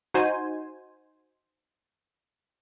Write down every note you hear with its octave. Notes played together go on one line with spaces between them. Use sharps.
D#4 F#4 C5 G#5